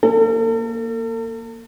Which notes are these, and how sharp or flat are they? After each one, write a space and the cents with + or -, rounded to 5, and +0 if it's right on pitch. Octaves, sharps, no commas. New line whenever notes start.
A#3 +0 A4 +45